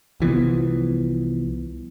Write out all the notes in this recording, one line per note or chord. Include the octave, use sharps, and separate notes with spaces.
C2 E3 F3 B3